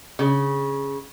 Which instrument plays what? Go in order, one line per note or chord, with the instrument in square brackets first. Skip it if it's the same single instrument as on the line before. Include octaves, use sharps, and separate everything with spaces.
[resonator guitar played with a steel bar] C#3